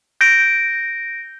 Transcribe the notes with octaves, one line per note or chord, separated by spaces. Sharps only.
G6 A#6 D7